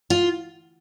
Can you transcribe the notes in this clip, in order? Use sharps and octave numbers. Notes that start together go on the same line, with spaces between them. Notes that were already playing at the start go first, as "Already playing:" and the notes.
F4